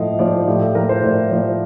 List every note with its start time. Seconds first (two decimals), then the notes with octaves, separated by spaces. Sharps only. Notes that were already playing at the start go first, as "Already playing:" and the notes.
Already playing: A2 F3 D#5 F5
0.19 F3 D5
0.47 A2 G4
0.61 A4
0.75 F3 A#4
0.89 C5
1.03 A2 D5
1.31 F3 C5